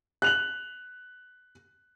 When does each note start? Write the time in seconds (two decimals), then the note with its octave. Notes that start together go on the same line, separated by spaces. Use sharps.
0.22 F#6 F7 F#7